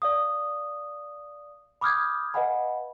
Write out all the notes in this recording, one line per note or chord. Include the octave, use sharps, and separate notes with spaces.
D5 F5 D#6
B5 D6 D#6 F6 G6 G#6
B4 D#5 F5 F#5 G#5 B5